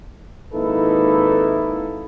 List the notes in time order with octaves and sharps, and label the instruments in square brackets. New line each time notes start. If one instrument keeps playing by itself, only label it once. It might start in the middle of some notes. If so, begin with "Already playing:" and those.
[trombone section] G#1 A#3 D#4 E4 A4 B4